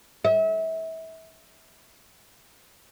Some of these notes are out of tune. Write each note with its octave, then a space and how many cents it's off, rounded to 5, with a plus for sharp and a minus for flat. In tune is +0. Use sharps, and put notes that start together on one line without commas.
E5 -30